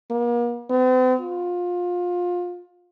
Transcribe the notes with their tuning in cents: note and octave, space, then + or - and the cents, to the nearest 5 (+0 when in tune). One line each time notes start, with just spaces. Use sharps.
A#3 +40
C4 -45
F4 +25